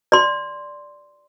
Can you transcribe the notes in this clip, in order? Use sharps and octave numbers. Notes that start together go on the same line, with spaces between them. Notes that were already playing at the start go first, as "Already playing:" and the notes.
D5 C6